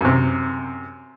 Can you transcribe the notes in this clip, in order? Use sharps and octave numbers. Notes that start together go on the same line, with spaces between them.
F#2 C3